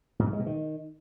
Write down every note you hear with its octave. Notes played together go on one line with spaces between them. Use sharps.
G#2
F#3
G#3
B2
D#3